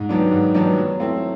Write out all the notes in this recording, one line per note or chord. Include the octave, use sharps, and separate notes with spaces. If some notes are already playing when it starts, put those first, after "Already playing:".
Already playing: G#2
D#3 F#3 B3 D4
G#2
D#3 F#3 B3 D4
F#3
A3 C4 E4